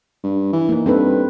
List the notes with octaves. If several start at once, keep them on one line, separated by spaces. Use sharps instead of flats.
G2
E3
A#3 D#4
G2 C4 A4 B4